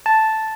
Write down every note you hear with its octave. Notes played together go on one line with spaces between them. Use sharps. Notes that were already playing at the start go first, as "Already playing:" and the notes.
A5